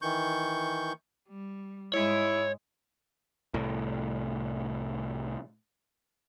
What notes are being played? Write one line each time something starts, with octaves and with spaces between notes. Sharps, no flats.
D#3 E3 C#6 G6
G3
G#2 G#3 E4 C#5
C2 A2